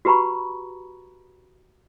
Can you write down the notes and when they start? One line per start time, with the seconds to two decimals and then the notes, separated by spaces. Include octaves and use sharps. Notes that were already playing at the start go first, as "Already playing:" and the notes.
0.05 F#4 G4 B4 A#5 B5 C#6